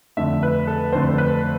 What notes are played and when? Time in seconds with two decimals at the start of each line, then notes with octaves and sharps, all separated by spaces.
0.17 F2 D3 A3 E5
0.43 B4
0.67 A4
0.93 F2 D3 A3 C5
1.18 B4